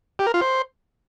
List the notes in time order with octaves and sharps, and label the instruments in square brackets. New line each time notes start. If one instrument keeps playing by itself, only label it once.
[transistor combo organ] G4
A#4
F4
C5